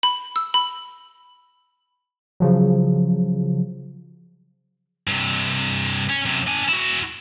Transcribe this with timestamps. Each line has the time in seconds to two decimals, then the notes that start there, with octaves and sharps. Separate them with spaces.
0.03 B5
0.36 E6
0.54 B5
2.40 C#3 F3 F#3
5.07 G2 C3
6.10 C#4
6.25 F#2 C3
6.47 D4 G#5
6.69 E4 F#4